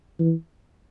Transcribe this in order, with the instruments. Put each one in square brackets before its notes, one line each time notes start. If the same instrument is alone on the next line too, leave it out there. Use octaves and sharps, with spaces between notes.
[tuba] E3